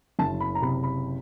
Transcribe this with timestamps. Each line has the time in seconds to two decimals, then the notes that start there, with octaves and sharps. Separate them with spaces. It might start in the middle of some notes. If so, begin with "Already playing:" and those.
0.19 F#1 A5
0.40 B5
0.55 A#5
0.62 C3 B5
0.83 B5